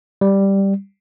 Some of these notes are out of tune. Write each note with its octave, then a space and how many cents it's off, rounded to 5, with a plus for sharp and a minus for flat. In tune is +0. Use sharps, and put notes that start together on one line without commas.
G3 +0